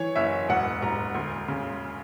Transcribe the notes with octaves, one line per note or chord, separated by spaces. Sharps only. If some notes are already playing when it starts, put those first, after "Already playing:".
Already playing: E3 C#5
F#1 E5
E1 F#5
E1 A#5
D2
C#3